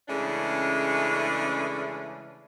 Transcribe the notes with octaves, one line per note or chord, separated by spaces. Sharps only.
C#3 E3 G#3 A3 C#4 D4